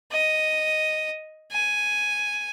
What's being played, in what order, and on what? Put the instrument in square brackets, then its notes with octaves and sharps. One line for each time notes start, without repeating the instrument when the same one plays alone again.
[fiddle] D#5
G#5